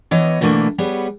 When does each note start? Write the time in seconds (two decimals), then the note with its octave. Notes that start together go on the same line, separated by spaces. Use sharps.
0.11 E3 B3 C#5 D#5
0.41 B2 D3 E3 A3 A#3
0.78 G3 B3 G#4 C#5